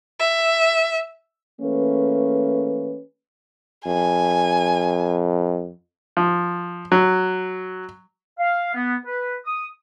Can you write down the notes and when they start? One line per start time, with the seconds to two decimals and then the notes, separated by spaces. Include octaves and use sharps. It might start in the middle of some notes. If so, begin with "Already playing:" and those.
0.20 E5
1.61 E3 A3 A#3 C#4 G#4 B4
3.86 F2 G#5
6.17 F3
6.92 F#3
8.39 F5
8.74 B3
9.06 B4
9.45 D#6